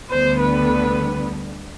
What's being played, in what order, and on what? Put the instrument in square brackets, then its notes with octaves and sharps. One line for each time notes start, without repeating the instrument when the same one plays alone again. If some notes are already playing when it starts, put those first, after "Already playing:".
[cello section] D2 D3 G3 B3 [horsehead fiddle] C5
[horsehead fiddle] B4